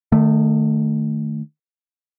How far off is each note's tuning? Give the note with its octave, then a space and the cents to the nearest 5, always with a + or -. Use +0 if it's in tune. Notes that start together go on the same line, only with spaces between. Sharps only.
D#3 -30 A3 +0